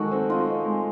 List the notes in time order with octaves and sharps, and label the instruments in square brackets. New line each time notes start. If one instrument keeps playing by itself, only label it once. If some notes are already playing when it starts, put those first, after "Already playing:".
Already playing: [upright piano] D#3 G#3 D#4 [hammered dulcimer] F#4 A4
[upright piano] C4
[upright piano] D#4 [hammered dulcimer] F4
[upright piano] C4
G#3